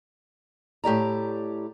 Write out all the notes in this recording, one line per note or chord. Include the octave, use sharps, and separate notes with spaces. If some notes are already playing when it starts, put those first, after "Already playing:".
A2 G4 D5 A#5